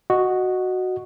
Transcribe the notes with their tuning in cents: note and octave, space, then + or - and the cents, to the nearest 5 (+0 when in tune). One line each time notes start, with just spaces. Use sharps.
F#4 +0 D#5 -10